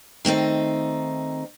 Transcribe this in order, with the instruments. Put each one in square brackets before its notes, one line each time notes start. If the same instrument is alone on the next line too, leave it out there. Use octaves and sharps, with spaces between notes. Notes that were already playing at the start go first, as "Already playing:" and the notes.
[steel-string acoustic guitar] D#3 A3 C4 D#4